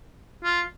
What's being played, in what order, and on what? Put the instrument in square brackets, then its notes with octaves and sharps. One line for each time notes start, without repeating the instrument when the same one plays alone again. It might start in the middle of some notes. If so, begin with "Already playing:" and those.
[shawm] F4